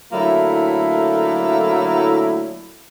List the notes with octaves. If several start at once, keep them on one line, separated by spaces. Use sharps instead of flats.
D3 F#3 A3 A#3 E4